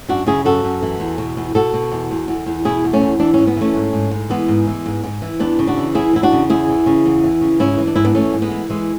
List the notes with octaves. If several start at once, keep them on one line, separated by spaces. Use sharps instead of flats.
F#2 D4 F#4
C#3 E4 G#4
F#2 F#4 A4
F#2
E3
E2
B2
E2
B2 F#4 A4
B2
E2
E2
E2
E2
B2 E4 G#4
E2
A3 C#4
E2
E3 D4
G#2 C#4
B3
E3 A3 C#4
G#2
G#2
G#2
E3 G#3 B3
G#2
E3
G#2
G#2
E3
E2 B3 D4
C#3
D4 F#4
E3
E2 E4 G#4
E2 E4
D4 F#4
C#3
E2 E4 G#4
E3
C#3
E2
E3
C#3
G#2 C#4 E4
E3
D4
G#2 E4
B3 D4
E3 A3 C#4
G#2
G#3 B3
E3
E3 G#3